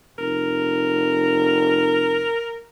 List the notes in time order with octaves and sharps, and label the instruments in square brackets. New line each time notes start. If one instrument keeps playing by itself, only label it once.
[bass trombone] F1 [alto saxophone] A#4